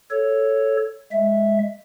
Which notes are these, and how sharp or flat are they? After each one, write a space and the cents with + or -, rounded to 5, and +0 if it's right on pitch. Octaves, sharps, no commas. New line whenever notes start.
A4 +0 C#5 +0
G#3 +0 E5 +0